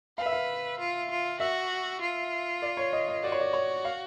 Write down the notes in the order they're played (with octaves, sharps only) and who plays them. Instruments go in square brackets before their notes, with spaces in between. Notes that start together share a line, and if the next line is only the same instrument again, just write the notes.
[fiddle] B4 [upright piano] F5
[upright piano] E5
F5
[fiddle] F4
F4
[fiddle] F#4 [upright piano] E5
[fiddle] F4
[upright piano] D5
C#5
D#5
D#5
[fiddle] F#4 [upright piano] D5
[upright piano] C#5
D5
C#5
F5